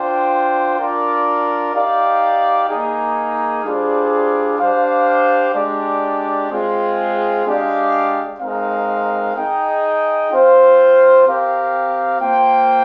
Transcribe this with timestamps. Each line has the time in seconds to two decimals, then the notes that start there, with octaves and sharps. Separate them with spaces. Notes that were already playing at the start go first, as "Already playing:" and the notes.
Already playing: D4 F4 C5 G5
0.78 D4 F4 A#4 D5
1.74 D#4 G4 D5 F5
2.69 A#3 D#4 G#4
3.64 G3 D4 F4 G#4 C5
4.59 D4 G4 C5 F5
5.54 G#3 D4 G4 D5
6.50 G#3 C4 F4 G#4
7.45 G#3 D4 G4 D5 F5
8.40 G#3 C4 D#4 A#4 F5
9.35 D#4 G#4 D#5 G5
10.30 C4 F4 C5 F5
11.25 C4 G4 A#4 F5
12.20 A#3 F4 C5 G5